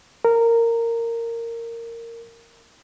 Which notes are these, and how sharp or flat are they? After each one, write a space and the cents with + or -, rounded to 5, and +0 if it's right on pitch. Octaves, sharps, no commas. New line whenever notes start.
A#4 -15